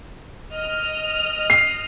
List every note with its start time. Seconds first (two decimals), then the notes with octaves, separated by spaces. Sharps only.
0.51 D#5 F6
1.50 C7